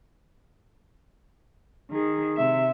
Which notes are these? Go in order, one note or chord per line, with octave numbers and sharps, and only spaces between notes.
D#3 G#4
C3 E5